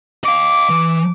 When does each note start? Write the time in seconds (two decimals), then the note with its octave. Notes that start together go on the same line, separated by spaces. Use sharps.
0.24 D#5 F5 D6
0.70 E3